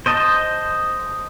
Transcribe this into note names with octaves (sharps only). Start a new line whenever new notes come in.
C5 D#5 A5